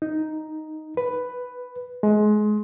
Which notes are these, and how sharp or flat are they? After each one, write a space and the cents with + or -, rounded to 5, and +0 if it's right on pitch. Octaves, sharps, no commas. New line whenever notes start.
D#4 +0
B4 +5
G#3 +25